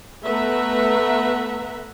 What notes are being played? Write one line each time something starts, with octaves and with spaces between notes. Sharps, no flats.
A3 B3 B4 E5 F#5 A#5